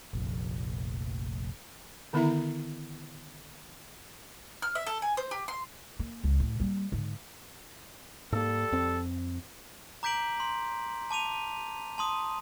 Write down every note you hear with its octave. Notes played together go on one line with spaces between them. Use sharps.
F1 A#1
D3 D#3 B3 E4 E5 A#5
F6
E5
A4
G#5
C5
G4
C6
A#3
C#2
A2 F3
G3 A#3
G#2 D3
G#2 G3 A#3 A4
F2 C4
A#5 D6 G6 B6 D7 F#7
C6
A5 D6 D#7 F7
A5 C6 D#6